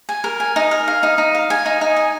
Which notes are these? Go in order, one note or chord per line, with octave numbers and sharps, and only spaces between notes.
G#5
A#4
G#5
D#4
A#4
F5
D#4
D#4
F5
G#5
D#4
D#4
G#5